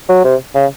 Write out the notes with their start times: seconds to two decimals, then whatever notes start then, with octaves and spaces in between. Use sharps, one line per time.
0.09 F#3
0.24 C3
0.55 C#3